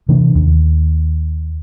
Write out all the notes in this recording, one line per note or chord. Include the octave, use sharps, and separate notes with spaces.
C3 E3 A3 D4
D#2